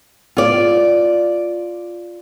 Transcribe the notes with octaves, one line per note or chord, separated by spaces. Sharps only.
F4 D5